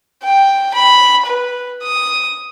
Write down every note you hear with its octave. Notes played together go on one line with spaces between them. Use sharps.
G5
B5
B4
D#6